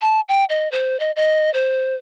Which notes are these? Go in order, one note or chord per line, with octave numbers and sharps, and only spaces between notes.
A5
G5
D#5
C5
D#5
D#5
C5